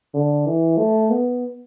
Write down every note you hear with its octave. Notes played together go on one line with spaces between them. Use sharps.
D3
E3
A3
B3